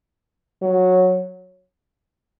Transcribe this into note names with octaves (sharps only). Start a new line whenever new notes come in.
F#3